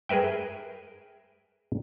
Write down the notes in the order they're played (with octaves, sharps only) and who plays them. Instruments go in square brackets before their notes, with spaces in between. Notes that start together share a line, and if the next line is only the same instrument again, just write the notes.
[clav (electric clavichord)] G#4 A#4 B4 E5 G5